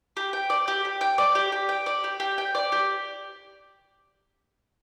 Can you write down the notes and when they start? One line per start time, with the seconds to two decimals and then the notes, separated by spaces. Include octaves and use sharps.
0.17 G4
0.33 G5
0.50 D5
0.68 G4
0.85 G4
1.01 G5
1.18 D5
1.35 G4
1.52 G4
1.69 G5
1.86 D5
2.04 G4
2.20 G4
2.38 G5
2.55 D5
2.72 G4